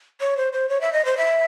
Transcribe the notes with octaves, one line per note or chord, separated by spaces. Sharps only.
C#5
C5
C5
C#5
E5
D#5
C5
E5